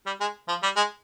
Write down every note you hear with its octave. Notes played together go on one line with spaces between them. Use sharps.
G3
G#3
F3
G3
G#3